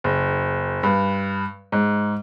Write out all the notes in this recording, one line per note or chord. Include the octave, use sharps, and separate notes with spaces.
F#1
G2
G#2